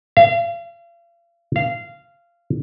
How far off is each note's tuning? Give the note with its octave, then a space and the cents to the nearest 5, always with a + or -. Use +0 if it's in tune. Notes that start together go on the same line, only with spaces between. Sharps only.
F5 -40
F5 -20